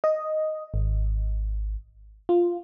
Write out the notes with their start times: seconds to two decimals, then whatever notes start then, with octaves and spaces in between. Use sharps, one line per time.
0.04 D#5
0.74 G#1
2.29 F4